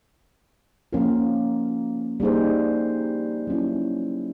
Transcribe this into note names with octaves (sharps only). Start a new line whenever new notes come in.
F3 A#3 C#4 F4 A#4
G3 A#3 D#4 G#4 C5
F#3 A#3 C#4 E4